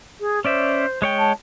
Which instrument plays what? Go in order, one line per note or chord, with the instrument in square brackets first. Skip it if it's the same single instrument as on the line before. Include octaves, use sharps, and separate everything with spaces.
[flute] G#4
[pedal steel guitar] C#4 D5 E5 [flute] C5
[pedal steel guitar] G#3 C#5 G5
[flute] A5